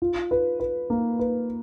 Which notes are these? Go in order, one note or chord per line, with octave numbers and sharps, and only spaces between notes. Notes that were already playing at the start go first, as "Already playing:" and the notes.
F4
B4
B4
A#3
B4